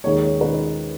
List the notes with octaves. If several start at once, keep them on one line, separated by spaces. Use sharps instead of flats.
D#2 D#3 G#3 D#4 C#5
C#5
D#3 G#3 D#4 B4